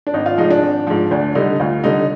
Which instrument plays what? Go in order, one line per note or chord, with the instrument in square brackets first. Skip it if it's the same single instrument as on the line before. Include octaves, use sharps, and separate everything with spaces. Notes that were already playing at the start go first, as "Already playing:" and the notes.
[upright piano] D4
G#1 D#4
F4
G#2 F3 D#4
D4
G#1
G#2 F3
D2 D4
D3 G3 D#4
D2 F4
D3 G3 D#4